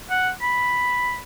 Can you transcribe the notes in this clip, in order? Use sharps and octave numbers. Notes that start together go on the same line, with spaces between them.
F#5
B5